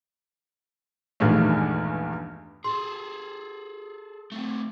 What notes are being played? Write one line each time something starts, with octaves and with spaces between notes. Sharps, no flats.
A#1 E2 G2 D#3 G#3 A3
G#4 A4 C6
A3 C4